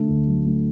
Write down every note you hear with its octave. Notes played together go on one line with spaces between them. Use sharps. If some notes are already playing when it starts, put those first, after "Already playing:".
Already playing: D3 A3
D2
F#3
A3